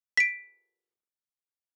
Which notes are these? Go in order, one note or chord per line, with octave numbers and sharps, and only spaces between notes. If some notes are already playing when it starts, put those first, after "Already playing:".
B6 D7